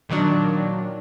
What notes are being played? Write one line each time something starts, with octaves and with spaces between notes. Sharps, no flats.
A#2 D#3 F#3 D4